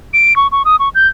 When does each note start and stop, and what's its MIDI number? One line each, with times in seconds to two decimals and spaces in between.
0.13 0.36 98
0.36 0.47 85
0.52 0.63 85
0.65 0.76 87
0.79 0.89 85
0.95 1.07 91